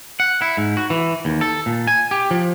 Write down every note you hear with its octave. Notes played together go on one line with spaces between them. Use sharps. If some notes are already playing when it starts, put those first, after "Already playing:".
F#5
E4
G#2
F#4
E3
D#2
A4
A#2
G#5
G4
F3